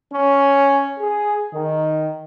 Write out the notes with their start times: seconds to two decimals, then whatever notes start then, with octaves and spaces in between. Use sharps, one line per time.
0.13 C#4
1.00 G#4
1.54 D#3